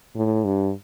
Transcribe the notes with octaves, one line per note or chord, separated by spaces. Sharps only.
A2
G2